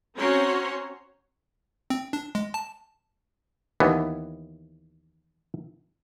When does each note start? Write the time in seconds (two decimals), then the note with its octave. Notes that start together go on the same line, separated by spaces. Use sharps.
0.17 C4 C#4 F#4 C#5 A#5 C6
1.90 C4
2.13 D4
2.35 G#3
2.54 A5
3.80 D#2 E3 B3